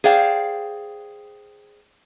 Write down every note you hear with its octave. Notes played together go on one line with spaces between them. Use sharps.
G#4 C5 D5 F5 G5